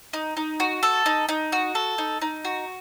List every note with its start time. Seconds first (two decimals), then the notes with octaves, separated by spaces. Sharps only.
0.13 D#4
0.37 D#4
0.60 F#4
0.83 A4
1.06 D#4
1.29 D#4
1.52 F#4
1.75 A4
1.98 D#4
2.22 D#4
2.45 F#4